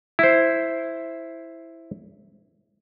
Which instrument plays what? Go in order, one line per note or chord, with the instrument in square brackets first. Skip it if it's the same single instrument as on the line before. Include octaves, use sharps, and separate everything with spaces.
[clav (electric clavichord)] E4 C5